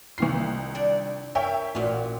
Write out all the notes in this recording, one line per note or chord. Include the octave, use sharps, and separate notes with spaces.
C2 D#3 F4 C7
D4 D5
A#4 C#5 E5 G5
A1 A#2 F#4 F5